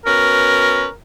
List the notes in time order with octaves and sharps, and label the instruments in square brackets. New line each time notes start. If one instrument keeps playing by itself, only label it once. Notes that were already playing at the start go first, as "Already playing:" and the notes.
[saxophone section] B2 C#4 B4 [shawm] A#4